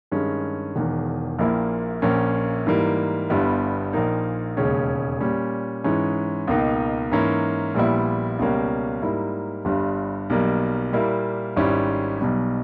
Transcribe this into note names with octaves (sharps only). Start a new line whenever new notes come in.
G2 D#3 G#3 C#4
E1 E2 D#3
A#1 A#2 A#3 E4
A#1 A#2 A#3 C#4
G#2 E3 G3 A#3
G1 G2 G3 B3 E4
A#1 A#2 A#3 D#4
E1 D#2 C#3 G#3 C#4
A#2 G3 C#4
G#2 E3 G#3 C#4
C#2 B2 A#3 D#4
G#2 E3 A#3 C#4 E4
A#1 A#2 G3 B3 E4
C#2 B2 G3 A#3 C#4
G#2 G3 A#3 E4
G1 G2 G3
B1 B2 G3 A#3
A#2 G3 A#3 E4
G#1 G#2 G3 C#4 E4
B1 B2 G3